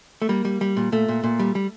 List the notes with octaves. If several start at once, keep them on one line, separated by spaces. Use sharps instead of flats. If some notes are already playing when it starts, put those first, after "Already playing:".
A3
G3 A#3
G3
G3
A#2
A#2 A3
A#2
A#2
G3
G3